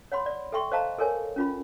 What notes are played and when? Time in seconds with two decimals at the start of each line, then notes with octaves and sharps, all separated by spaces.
0.12 C#5 F#5 B5 C6
0.26 D5
0.52 A4 E5 G5 C6 C#6
0.72 C5 D#5 F5 A5 A#5
0.98 A4 A#4 C#5 G#5
1.36 C#4 F4 B5